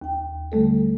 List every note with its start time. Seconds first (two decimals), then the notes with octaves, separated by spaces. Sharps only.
0.02 D#2 G5
0.52 D3 G3 A3 A4